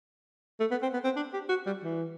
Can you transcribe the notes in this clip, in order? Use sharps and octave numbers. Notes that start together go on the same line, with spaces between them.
A3
B3
C4
B3
C4
D4
G4
F#4
G3
E3